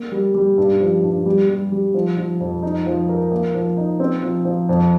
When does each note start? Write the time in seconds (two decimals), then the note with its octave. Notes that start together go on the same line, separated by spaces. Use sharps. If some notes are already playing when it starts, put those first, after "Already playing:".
Already playing: A#3
0.12 G3
0.34 G3
0.58 G2
0.80 F3
1.03 G2
1.26 G3
1.49 G3
1.72 G3
1.94 F3
2.17 F3
2.40 F2
2.63 D#4
2.86 F3
3.09 A#4
3.32 A#3
3.54 F3
3.77 D#4
4.00 C4
4.23 F3
4.45 F3
4.69 F2